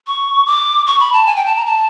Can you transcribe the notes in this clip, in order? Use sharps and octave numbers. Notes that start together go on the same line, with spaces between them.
C#6
D6
C#6
B5
A5
G#5
G5
A5
A#5
A5